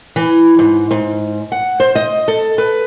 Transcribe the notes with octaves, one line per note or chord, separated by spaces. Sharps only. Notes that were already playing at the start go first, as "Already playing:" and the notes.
E3
G#2
G#2
F#5
C5
D#5
A4
B4